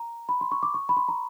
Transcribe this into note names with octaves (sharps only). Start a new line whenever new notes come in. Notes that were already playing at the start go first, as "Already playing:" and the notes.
Already playing: A#5
B5
C6
C#6
D6
C#6
B5
C6
A#5